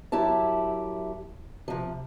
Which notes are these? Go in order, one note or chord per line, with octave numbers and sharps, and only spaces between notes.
F#2 E4 G4 A5
C3 F3